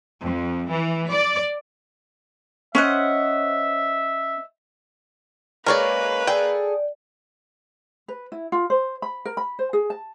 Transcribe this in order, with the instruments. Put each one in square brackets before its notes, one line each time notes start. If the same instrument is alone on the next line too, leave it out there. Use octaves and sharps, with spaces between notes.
[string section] F2
E3
D5
[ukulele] C#4 [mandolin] C5 D#5 F#5 [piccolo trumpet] E5
[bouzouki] G#3 C4 C#4 [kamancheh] A#3 B4 [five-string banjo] A#4 C#5 D5
[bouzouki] G#4 A4 [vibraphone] D5 [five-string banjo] G5
[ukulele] B4
E4
F4
C5
B5
A#4
B5
C5
G#4
A5